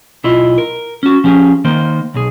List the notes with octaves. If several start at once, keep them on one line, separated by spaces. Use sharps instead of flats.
B1 E4 F4 D#5
A#4
C#4 F#4
F3 C#4 G4 G#4
D#3 A#3 C5
B1 G#4